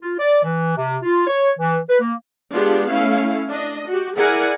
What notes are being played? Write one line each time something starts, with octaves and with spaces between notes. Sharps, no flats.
F4
D5
E3
C3
F4
C#5
E3
B4
A#3
G#3 B3 D4 F4 G4
A3 C#4 E4 F5
D4 D#5
F#4 G4
E4 G#4 A#4 D5 F#5 G#5